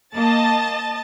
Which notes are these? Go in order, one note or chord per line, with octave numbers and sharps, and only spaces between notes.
A#3 D#5 A5 A6